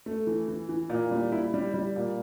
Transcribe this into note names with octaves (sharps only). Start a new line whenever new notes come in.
A3
E3
E3
E3
A#2
G3
E4
G3
G3
A#2